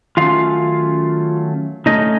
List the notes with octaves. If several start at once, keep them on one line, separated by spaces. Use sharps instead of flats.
D#3 F#3 A3 C#4 F4 F5
C#3 A3 C#4 D#4 D#5